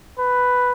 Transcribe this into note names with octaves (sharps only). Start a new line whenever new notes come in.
B4